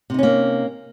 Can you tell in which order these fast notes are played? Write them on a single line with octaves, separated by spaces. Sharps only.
C3 D#4 C#4 A#3